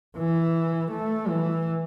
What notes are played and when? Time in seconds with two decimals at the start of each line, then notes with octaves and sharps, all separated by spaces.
0.18 E3
0.91 A3
1.29 E3